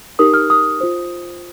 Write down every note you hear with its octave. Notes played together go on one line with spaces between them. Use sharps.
D#4 G4 A#4 D#6
F6
D#6
F4 C5